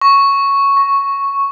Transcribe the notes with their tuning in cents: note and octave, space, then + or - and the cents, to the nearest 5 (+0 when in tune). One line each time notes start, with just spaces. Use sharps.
C#6 +0
C#6 -10